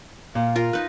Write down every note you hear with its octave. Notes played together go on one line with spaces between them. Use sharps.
A#2 F5
F4 A#4
D#4 B4